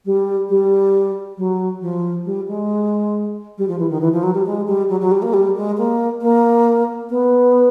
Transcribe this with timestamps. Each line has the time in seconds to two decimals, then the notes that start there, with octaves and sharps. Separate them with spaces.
0.05 G3
0.49 G3
1.37 F#3
1.81 F3
2.25 G3
2.48 G#3
3.58 G3
3.68 F3
3.79 E3
3.90 D#3
4.01 E3
4.13 F3
4.23 F#3
4.35 G3
4.46 G#3
4.67 G3
4.89 F#3
5.00 F#3
5.12 G3
5.22 A#3
5.34 G3
5.56 G#3
5.77 A#3
6.21 A#3
7.10 B3